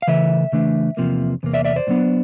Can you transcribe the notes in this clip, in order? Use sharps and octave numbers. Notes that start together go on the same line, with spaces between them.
F5
C#3 E3 A3 E5
C#3 E3 A3 D4
E2 C3 F3 A#3
E2 C3 A#3
D5 E5
D5 E5
C5 D5
A2 F#3 B3 D4